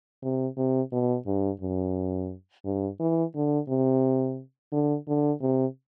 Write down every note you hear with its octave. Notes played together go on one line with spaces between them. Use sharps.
C3
C3
B2
G2
F#2
G2
E3
D3
C3
D3
D3
C3